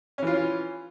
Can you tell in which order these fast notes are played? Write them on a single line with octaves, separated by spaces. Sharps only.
C#4 E3 F4